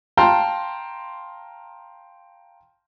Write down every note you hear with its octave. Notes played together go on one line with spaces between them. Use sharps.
F5 G5 A5 A#5 C6 F6